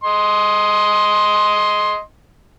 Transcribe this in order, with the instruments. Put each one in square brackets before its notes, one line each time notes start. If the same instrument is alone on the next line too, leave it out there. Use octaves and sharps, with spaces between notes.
[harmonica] D#5 C6